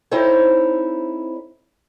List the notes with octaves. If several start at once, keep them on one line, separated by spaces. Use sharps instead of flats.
C4 D#4 E4 A4 C5 C#5